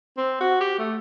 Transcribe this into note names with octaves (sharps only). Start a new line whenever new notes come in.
C4
F#4
G4
A3